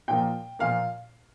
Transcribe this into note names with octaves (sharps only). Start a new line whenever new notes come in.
A#2 F3 A#3 G5
A#2 F3 A#3 F5